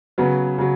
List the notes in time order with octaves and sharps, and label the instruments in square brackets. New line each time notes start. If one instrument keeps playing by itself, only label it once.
[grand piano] C#3 F#3 B3
C#3 F#3